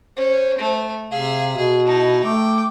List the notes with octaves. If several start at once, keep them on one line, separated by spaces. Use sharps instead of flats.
C#4 C5
A3
C3 G#4 E5 F5
B2 G#4
D#4 E4 A5
A3 G5 D6